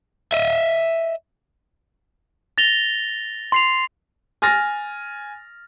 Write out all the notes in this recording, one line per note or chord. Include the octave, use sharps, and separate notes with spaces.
D#5 E5
A6 A#6 F7 G7
C6 C7 F7
G#5 F6 A6 A#6